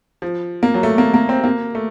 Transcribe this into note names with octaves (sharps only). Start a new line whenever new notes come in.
F3
A#3
F#3
A3
A#3
A#3
C4
A#3
A3